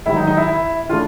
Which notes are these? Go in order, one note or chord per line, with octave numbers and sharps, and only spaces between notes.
A1 G#2 D#3 F#3 E4
D#4
D#4
E4
E4
C#3 E3 A3 D4 F4